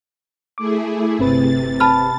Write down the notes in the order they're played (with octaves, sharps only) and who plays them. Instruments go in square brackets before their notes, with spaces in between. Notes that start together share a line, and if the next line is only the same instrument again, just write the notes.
[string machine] A3 E4 G#4 [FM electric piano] D6
[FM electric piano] G1 C4 B4 [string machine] C3 A6
[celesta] A5 B5 F6